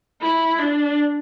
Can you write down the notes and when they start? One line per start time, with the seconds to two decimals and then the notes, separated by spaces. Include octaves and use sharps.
0.21 E4
0.59 D4